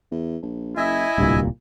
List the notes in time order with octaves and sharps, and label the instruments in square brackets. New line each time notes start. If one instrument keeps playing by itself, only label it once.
[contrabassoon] E2
A#1
[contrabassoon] F#1 [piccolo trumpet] E4 [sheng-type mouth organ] D#5 E5 G#5
[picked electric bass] D1 C2 A#2 [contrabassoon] G2